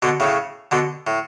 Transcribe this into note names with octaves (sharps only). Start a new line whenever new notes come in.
B2 D3
A2 C#3
B2 D3
A2